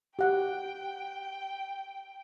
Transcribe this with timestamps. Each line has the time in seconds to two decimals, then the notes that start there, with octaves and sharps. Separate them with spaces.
0.19 G4 F#5 G5